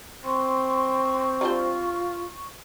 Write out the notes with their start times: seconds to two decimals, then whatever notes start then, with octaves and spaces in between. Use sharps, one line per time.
0.24 C4 C6 C#6
1.41 G3 D4 F4 C5